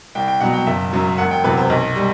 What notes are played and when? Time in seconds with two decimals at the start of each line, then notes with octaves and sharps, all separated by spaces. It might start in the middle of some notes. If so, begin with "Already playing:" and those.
0.15 C2 G5
0.28 G5
0.40 B2 F#3 F#5
0.54 G5
0.67 F#1 E5
0.93 F#2 F#3
1.18 E1 F#5
1.31 G5
1.44 E2 C3 F#3 B4
1.57 C5
1.70 B1
1.96 G3